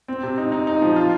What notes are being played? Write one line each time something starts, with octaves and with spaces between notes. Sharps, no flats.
C4
C3
D#4
D#4
D#4
F3
F4